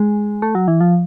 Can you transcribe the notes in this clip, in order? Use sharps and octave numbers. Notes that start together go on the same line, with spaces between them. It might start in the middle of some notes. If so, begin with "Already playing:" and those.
Already playing: G#3
A3
F#3
E3
F3